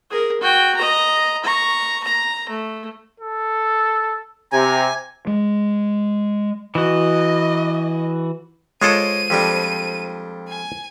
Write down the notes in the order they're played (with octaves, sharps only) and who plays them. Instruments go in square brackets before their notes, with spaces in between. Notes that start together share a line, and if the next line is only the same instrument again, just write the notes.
[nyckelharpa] G#4 A#4
F#4 G5
D#5 A#5
A#5 C#6
A#5
A3
[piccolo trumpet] A4
[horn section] C3 [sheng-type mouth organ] G#5 [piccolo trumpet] A#5
[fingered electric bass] G#3
[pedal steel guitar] E3 F#4 [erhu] D#5
[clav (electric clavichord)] G#3 F4 A4 [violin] C5 D#7 [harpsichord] C#5 D#5 D6
[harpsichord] F2 G3 D4
[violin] G#5